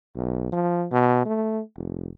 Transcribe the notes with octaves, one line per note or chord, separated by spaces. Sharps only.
B1
F3
B2
A3
F1